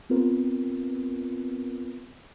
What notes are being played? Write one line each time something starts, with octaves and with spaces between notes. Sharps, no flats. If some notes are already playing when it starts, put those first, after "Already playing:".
B3 C4 F4 G4 A#4 B4